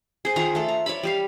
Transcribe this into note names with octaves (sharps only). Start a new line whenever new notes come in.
G#4 C5
D#3 F4 F#5 A#5
A3 A4
A#5
C#5 D5 E5 B5
G3 G4 F5